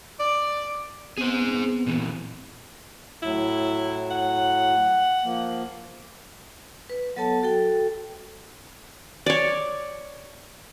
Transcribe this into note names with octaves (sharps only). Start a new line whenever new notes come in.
D5
B3 C4 G#4 C5
A#2 E3
A2 F#3 E4
F#5
F3 A#3
B4
F#3 B3 A4 C#5 A5
F#4 A4 G5
C#5 D5